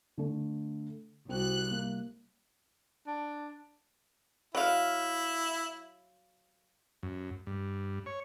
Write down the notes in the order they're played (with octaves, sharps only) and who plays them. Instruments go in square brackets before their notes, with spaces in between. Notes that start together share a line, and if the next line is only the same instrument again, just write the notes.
[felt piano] D3 A3
[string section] C2 F#6 [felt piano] C4 F#4
[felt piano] A#3
[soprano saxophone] D4
[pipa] F#3 F5 [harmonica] E4
[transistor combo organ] F#2
G2
C#5